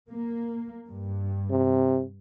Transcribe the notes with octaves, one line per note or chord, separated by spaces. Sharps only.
A#3
G2
C3